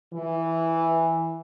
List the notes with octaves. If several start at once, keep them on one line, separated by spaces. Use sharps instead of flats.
E3